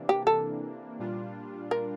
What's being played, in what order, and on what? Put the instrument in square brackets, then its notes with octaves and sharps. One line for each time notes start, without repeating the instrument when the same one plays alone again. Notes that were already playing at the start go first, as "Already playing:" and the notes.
Already playing: [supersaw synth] C3 E3 A#3 D4
[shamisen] G4
A4
[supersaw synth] A#2 G3 D4 F4
[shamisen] A#4